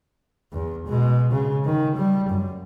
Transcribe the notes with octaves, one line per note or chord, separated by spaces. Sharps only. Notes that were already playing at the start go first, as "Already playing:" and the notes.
E2
B2 G#3
C#3
D#3
G3
F#2